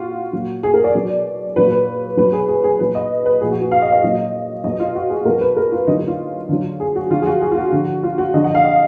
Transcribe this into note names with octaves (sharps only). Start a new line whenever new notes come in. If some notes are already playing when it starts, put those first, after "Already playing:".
Already playing: A#2 F4 F#4
A#2 F#3
G#4
A#4
D5
B2 F#3
A#2 F#3 B4
B4
B2 F#3 B4
G#4
G#4
G#4
A#2 F#3 B4
D#5
B4
A#2 F3 G#4
F#4
F#4
F5
D#5
D#5
A#2 F#3
B2 F#3 D#5
F4
F#4
G#4
B2 F#3 A#4
B4
A#4
F4
D3 F#3 D#4
D#4
F4
D3 F#3
G#4
F#4
D3 F3 F4
G#4
F#4
G#4
F4
F#4
D3 F3
F4
F#4
D3 F3 D#5
F#5
F5
D#5